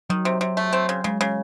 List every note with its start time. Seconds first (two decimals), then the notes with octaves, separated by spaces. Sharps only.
0.10 D#3 F#3
0.25 C3
0.41 C3
0.57 A3
0.73 C4
0.89 C#3
1.04 C#3 G#3
1.21 C#3